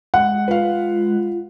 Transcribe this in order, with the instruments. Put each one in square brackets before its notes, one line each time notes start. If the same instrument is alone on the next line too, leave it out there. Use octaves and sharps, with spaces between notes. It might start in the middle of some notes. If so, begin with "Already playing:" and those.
[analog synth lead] G#3 [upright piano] F#5
[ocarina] F4 [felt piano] B4 F5